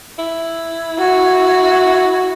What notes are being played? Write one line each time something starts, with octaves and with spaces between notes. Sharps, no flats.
E4
F#4